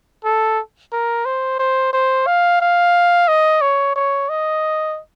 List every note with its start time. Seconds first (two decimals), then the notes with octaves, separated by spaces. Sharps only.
0.24 A4
0.92 A#4
1.26 C5
1.59 C5
1.93 C5
2.27 F5
2.61 F5
3.28 D#5
3.61 C#5
3.96 C#5
4.29 D#5